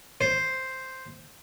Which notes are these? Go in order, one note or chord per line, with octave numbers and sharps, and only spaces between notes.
C5